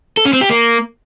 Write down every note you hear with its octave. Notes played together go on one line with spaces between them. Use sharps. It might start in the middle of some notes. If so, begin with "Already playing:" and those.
A4
C#4
C4
G4
A#3